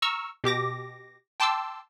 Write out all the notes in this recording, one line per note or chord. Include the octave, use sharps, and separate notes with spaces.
A#5 C#6 E6 F6
B2 G4 D6 A#6
G5 A5 C6 D6 E6